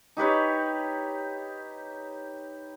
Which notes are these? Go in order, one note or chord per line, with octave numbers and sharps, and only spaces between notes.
D#4 G4 B4 C#5